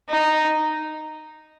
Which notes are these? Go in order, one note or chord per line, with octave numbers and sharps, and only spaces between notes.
D#4